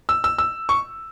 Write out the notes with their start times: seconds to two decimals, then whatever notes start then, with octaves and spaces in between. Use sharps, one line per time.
0.09 E6
0.24 E6
0.38 E6
0.69 C#6